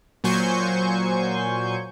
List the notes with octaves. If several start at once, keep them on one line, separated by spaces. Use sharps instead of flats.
A#2 F#3 C5 G#5 C#6 G6